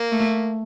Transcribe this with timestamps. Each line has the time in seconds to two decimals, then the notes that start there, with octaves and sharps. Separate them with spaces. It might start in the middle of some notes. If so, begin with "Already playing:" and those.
Already playing: A#3
0.12 A3